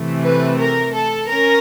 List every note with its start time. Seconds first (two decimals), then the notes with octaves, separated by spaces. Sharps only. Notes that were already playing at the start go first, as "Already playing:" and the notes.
Already playing: C3 E3 A3
0.22 B4
0.58 A#4
0.94 A4
1.29 C#4 A#4